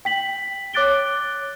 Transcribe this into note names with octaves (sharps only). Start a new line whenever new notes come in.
G5 B6 F#7
C#5 D6 F#6 A6 D7 G7